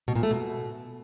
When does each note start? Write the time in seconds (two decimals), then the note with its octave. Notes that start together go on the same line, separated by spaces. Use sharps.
0.08 B2
0.15 A#2
0.23 A3
0.31 B2